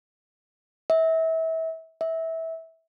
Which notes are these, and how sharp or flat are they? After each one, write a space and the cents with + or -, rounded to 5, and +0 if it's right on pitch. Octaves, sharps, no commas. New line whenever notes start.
E5 -30
E5 -20